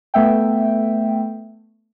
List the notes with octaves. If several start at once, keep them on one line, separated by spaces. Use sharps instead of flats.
A3 B3 E5 G5